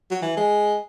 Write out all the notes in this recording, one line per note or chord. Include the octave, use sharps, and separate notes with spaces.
F#3
E3
G#3